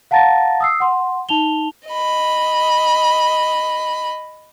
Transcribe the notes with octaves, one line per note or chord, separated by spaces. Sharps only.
F5 F#5 A5 A#5 A6 A#6
D#6 E6 C7
F#5 C6
D#4 A5 F7 G7
D#5 B5